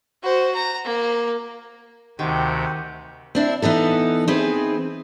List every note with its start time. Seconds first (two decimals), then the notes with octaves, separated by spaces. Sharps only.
0.23 F#4 C5
0.55 A#5
0.85 A#3
2.19 D2 C3 D#3 C4 F#4 G4 G6
3.35 C4 D4 E4
3.62 E3 B3 D#4 A4
4.28 C4 D#4 G#4 B4